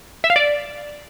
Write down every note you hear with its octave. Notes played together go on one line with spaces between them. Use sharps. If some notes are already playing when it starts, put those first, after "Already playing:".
E5
F5
D5